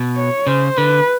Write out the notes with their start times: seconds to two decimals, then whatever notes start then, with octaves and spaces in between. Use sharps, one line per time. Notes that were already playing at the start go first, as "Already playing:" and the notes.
Already playing: B2
0.16 C#5
0.47 C#3 C5
0.77 D3 B4